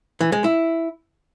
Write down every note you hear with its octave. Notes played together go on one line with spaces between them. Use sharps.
E3
G#3
E4